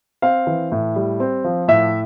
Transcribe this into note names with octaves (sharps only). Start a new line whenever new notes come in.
C4 F5
E3
A2
G3
C4
F3
A2 E5